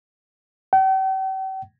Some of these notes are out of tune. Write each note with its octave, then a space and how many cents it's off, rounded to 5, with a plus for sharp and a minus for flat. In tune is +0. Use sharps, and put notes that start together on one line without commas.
G5 -45